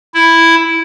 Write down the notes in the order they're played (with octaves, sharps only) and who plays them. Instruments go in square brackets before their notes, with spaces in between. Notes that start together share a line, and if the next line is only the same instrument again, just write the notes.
[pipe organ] E4